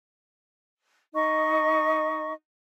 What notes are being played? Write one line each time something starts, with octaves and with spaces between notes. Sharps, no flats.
D#4 D#5 C#6